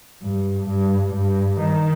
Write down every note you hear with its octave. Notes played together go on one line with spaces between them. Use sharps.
G2
G2
G2
D#3